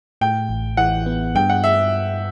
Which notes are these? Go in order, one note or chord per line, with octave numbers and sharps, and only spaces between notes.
A2 G5
A1
E3 F#5
B3
G2 G5
F#5
E5